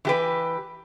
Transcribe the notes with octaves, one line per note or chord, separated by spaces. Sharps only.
E3 G4 B4